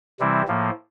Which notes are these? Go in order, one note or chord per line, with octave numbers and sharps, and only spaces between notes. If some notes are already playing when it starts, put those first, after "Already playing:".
C3 E3 G3 C4 E4
A2 F3 A#3